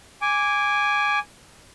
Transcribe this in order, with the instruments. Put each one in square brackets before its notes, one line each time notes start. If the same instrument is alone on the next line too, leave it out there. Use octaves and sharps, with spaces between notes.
[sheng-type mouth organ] G#5 D6